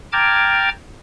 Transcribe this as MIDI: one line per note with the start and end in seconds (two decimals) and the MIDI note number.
0.12 0.69 79
0.12 0.69 81
0.12 0.69 82
0.12 0.69 86
0.12 0.69 89
0.12 0.69 92